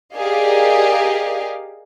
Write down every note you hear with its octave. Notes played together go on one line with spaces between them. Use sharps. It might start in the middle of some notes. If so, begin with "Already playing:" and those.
G4 G#4 A#4 D5 D#5 F5